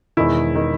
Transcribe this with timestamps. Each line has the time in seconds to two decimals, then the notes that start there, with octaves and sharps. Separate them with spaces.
0.17 E1 E2 D#3 E4
0.55 D#3